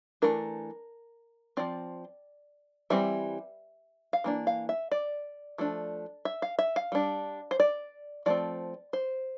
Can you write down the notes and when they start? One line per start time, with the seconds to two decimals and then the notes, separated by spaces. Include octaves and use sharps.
0.22 E3 A3 D4 A#4
1.57 F3 C4 D5
2.90 E3 G3 C4 E5
4.13 F5
4.24 E3 A#3 D4
4.47 F5
4.69 E5
4.92 D5
5.58 F3 A3 D4
6.25 E5
6.42 F5
6.59 E5
6.76 F5
6.92 G3 D4
7.51 C5
7.60 D5
8.26 F3 A3 C4 D5
8.93 C5